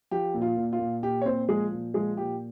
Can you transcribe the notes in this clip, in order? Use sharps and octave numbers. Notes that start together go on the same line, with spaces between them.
F3 G4
A#2
F4
A#2
F4
A#2
A#2 G4
C#5
A#2 C4 C5
F3 G#3 G#4
A#2
F3 G#3 G#4
A#2 G4